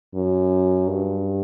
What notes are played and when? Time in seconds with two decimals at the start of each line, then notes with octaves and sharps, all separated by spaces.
0.14 F#2
0.88 G2